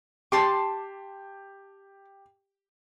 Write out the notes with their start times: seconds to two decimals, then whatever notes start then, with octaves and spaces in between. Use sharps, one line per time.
0.32 G4 A5 C6 D6